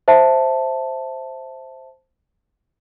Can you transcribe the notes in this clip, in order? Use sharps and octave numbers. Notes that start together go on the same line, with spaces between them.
C5 E5 A5